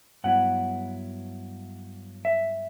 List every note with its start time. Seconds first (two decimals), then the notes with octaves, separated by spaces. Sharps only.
0.24 G2 F#3 B3 E4 F#5
2.25 E5